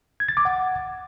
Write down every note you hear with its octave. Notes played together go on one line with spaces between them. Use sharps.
G#6
A6
D6
F#5